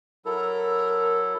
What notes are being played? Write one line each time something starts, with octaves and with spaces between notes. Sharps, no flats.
F#3 E4 A4 A#4